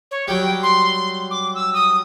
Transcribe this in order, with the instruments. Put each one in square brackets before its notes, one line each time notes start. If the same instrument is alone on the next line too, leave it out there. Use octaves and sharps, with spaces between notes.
[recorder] C#5
[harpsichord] F#3 G3 [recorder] G5
[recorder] C6
D6
E6
D#6